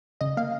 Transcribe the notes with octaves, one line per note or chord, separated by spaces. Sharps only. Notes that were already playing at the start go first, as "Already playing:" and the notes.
C#3 D#5
A#3 F5